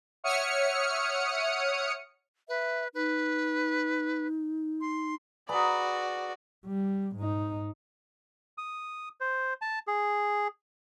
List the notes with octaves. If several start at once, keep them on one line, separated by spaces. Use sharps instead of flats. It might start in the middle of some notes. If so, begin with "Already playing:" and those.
C#5 E5 F#5 D#6 F6 C#7
B4 E5
D#4 B4
C6
F#4 G#4 B4 D5 A#5
G3
G#2 D#4
D#6
C5
A5
G#4